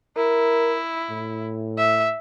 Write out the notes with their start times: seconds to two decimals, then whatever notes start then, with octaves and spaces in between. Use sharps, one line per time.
0.17 E4 A#4
1.10 A2
1.78 E5